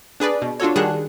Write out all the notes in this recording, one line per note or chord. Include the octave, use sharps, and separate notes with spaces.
D4 G#4 B4 D5
B2
D4 F4 F#4 A4 C#5
D#3 G3 D4 G#4 F#5 F#6